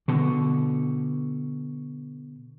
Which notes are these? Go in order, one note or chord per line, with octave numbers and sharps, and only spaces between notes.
B2 D3